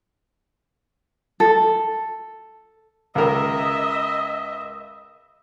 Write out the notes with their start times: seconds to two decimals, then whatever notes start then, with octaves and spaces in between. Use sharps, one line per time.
1.40 A4
3.15 C#2 A#4 D#5 E5